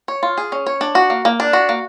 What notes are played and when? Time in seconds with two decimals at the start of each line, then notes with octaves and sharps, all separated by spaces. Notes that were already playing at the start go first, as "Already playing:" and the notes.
0.08 C#5
0.23 F4
0.38 G#4
0.52 C#4
0.67 C#5
0.81 D4
0.95 F#4
1.10 A#3
1.25 A#3
1.40 D4
1.53 F#4
1.69 A#3